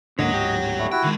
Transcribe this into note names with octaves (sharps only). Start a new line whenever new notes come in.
D1 G#2 D3 A#3 C#5 D#5 F#5
G4
G3 A3
E4 F#4 G5
D3 D#3 G#3